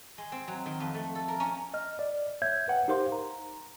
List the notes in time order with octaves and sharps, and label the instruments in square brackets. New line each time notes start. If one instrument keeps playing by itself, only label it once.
[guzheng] G#3
C4
F#3
D#3
F2
A3
A4
A#4
C#4
[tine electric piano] D#5 F6
D5
C#5 E5 G6 G#6
B4 F#5 G5
D#4 G4 A#4 C5 F5 C6
A#5